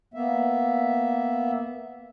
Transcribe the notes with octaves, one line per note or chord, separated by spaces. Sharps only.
A#3 B3 E5